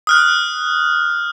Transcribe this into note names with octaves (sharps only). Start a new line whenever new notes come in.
D#6 F6 F#6